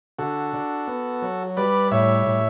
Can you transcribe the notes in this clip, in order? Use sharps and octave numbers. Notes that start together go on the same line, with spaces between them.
D3 F#4 A4
D4
B3
F#3
G3 B4 D5
A2 C#5 E5
A2